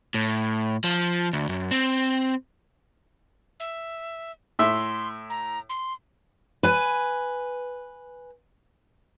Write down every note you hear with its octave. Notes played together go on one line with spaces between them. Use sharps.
A2
F3
D2
F#2
C4
E5
A2 E5 C6
A#5
C6
B4 G#5